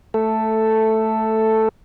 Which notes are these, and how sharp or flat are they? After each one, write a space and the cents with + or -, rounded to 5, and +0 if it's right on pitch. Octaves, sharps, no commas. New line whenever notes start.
A3 +0 A4 +5